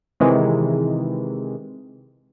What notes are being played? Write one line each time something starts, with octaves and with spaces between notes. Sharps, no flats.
C3 D#3 E3 G#3